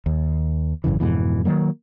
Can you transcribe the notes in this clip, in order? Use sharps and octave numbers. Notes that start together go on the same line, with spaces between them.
D#2
G#1 F#2 C#3 E3
F2 G#2 B2 E3
D#3 F3 F#3 A#3